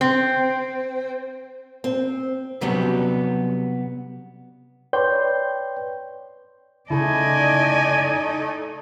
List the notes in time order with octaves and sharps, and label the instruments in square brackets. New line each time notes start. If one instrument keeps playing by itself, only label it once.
[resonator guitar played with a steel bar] C4
[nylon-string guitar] C4
[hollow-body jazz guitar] C3 F#3 G3 B3 C#4
[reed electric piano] B4 C#5 D5 G5 C6 G6
[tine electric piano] C#3 E4 [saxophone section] A3 D#4 [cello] D5 D#5 [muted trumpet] G#5